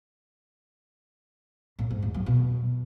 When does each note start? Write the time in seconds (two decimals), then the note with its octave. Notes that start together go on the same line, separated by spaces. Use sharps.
1.79 A2
1.91 G#2
2.02 E2
2.14 F#3
2.26 B2